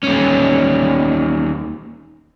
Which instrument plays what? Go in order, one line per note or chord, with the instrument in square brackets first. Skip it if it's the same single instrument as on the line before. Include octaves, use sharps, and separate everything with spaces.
[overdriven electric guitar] D#2 C#4